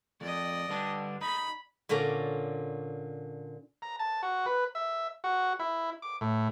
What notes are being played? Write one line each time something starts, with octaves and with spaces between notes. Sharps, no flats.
F2 D5 D#5
G2 D3 D4
D#4 B5
A#2 D3 C#4 D5 A#5
A#5
A5
F#4
B4
E5
F#4
E4
D6
A2